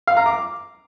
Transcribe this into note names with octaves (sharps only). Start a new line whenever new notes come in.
F5
A#5
D6